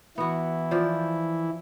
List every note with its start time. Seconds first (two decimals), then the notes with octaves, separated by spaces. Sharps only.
0.18 E3 B3 E4 F#4
0.71 F3 C5 D5